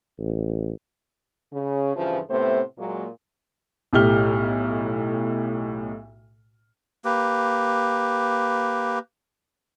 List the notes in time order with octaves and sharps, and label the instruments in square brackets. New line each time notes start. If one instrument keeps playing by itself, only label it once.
[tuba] A1
[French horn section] C#3
G2 C#3 E3 F3
A2 C3 A3 B3 C5
A#2 F#3 G#3 A#3
[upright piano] B1 A2 G4 F6 G7
[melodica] A#3 G4 B4